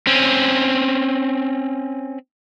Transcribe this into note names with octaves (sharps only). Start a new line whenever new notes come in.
C4 C#4